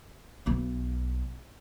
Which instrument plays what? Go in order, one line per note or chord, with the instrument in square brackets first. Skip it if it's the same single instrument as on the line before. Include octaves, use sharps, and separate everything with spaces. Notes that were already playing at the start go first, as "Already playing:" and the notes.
[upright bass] B1 B3